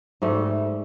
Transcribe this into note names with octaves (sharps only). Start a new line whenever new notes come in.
G#2 G3 A3